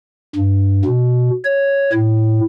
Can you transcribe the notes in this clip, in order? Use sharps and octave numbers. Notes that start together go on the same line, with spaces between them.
G2
B2
C#5
A2